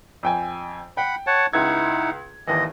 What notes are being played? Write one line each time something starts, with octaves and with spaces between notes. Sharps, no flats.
F2 G5 G#5
F#5 G5 B5
C#5 F#5 A5
C#2 D#4 E4 F#5 G#6
G#1 D#2 E3 D#5